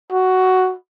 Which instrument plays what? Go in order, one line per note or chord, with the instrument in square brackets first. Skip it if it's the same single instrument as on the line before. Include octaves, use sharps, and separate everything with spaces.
[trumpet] F#4